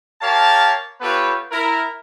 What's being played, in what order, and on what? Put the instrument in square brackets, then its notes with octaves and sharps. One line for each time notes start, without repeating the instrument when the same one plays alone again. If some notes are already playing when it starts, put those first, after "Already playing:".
[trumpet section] G4 A#4 C#5 F5 A5
B3 F4 G4 A4 B4 C#5
E4 A#4